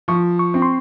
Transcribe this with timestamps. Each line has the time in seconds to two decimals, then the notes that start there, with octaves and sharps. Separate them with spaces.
0.08 F3 C#6
0.39 C#6
0.54 C4
0.62 C6